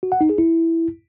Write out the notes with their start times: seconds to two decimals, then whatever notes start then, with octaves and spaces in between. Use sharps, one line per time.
0.03 F#4
0.12 F#5
0.21 D#4
0.30 G#4
0.38 E4